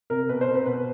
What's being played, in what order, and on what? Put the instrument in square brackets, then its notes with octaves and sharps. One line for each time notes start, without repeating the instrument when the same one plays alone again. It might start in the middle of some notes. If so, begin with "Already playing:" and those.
[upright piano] C3 A#4
B2 B4
C5
C4
B4
B2 B4